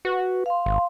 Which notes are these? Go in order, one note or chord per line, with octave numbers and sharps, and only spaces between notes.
F#4 B4
F5 C6
G#1